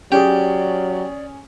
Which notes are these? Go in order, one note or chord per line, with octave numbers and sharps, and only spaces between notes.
F#3 C#4 G4 G#4 D5